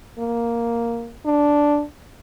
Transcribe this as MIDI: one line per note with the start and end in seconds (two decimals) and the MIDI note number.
0.19 1.12 58
1.26 1.83 62